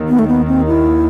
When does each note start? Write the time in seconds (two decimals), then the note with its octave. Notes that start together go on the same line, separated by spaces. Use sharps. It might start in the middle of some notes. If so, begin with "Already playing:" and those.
Already playing: D#2 D#3
0.09 B3
0.19 A3
0.28 B3
0.48 C4
0.67 E4